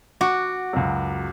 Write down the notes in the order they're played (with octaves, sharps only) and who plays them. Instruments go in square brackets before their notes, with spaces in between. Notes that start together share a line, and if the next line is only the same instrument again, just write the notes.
[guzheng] F#4 [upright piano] D6
[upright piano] C#2 F#2